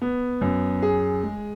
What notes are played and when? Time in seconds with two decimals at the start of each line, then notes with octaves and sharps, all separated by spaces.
0.02 B3
0.41 F#2
0.82 G#4
1.23 G#3